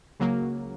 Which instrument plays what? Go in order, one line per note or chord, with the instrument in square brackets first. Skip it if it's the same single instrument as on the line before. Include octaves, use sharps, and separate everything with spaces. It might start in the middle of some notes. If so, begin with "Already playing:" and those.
[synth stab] C#2 C#3 F#3 A#3